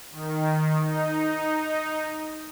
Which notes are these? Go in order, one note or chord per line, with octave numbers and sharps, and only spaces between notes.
D#3
D#4